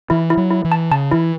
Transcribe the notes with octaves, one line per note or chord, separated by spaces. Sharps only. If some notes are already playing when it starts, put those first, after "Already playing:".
E3 E4
E4
F#3
E4
E3
A5
C#3 A5
E3 E4